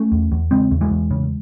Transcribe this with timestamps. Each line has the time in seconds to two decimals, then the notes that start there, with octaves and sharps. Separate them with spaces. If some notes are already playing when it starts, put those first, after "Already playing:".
Already playing: A3 C#4
0.12 E2
0.32 E2
0.51 C#3 G#3 C4
0.71 E2
0.81 E3 G#3
0.91 E2
1.11 C#3